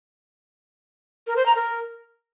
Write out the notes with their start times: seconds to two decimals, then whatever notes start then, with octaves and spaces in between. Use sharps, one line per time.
1.27 A#4
1.36 C5
1.46 A#5
1.55 A#4